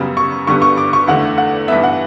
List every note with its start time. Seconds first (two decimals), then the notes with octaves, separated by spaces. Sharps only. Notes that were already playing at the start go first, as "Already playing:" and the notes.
Already playing: F#2 C#3 G3 B3
0.17 C#6
0.47 G2 D3 G3 B3 C#6
0.62 C#6
0.78 D6
0.93 C#6
1.07 E2 D3 A3 F#5
1.38 F#5
1.68 G2 E3 B3 E5
1.84 F#5